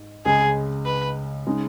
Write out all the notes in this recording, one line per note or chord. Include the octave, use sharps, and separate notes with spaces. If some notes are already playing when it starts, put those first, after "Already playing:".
Already playing: G#2
C#2 C#3 G#3 G#4
B4
C#3 G#3 D#4